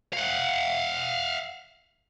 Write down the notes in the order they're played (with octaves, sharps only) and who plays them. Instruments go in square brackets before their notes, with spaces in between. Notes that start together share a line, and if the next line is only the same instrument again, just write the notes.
[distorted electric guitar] F5 F#5